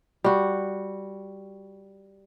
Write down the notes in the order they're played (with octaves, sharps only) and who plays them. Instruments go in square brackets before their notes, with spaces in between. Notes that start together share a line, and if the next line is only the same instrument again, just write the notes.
[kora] G3 F#4